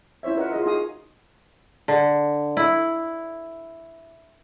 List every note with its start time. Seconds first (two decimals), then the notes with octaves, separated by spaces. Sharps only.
0.23 C#4 E4 C5 C#5 E5
0.37 F4 A#4 B4 D#5 E5 F#5
0.52 F4 G#4 D#5
0.66 D#4 F#4 G#4 F5 D#6
1.88 D3
2.57 E4